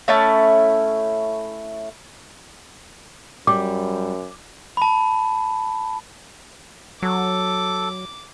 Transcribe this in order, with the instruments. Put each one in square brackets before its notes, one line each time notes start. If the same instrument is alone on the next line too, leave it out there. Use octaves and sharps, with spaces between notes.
[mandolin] A3 C#4 E4 A5
[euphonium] F#2 [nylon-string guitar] G3 [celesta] D6
[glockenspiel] A5 B5
[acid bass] F#3 [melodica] A4 [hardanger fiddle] D6